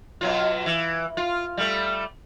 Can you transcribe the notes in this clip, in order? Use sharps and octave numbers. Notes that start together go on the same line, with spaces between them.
B2 F#3 F4
E3
F4
G3 A3